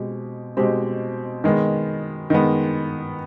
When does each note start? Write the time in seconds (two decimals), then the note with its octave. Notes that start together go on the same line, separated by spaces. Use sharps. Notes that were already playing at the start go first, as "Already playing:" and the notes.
Already playing: B2 G#3 C4 G4
0.57 B2 G#3 C4 G4
1.44 D#3 G#3 B3
2.30 D#3 G#3 B3